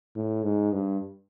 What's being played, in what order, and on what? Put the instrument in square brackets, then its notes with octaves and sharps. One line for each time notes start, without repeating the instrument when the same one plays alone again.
[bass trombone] A2
G#2
G2